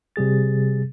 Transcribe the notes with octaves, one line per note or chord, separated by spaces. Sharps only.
C3 G3 G#4 A6